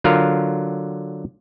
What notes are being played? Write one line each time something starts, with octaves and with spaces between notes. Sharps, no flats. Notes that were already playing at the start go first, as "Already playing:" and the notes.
D3 F#3 F4 A#4 F5